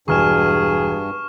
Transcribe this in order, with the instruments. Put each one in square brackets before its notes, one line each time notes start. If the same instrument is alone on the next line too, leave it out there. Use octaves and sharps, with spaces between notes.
[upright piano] E1 G#5 [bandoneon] G2 [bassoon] G#4 [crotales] C#6 F6 E7